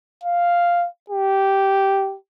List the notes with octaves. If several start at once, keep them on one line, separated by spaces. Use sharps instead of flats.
F5
G4